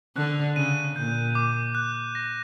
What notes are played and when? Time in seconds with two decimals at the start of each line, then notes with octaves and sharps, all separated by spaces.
0.16 D3 F#6
0.56 C#3 D#7
0.96 A#2 G6
1.35 D6
1.75 F#6
2.15 A#6